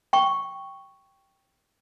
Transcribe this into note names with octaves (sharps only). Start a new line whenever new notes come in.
G5 C#6